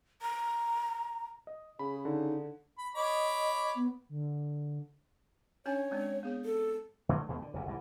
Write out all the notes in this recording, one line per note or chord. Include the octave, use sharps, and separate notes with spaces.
A#5
D#5
C#3 G#4 B5
D3 D#4
B5
C#5 D#5 B5 D6
B3
D3
C#4 D4 C#5 G#5
G#3 C4 D4
B3 G#4 C#5
A4
D3 F#3 A3
D#2 B2 A3
D3
F#1 E2 C3
C2 G#2 D#3 E3